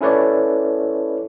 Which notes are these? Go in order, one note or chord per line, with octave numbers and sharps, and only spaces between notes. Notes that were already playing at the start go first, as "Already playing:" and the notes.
C#4 E4 A4 B4 C#5 D5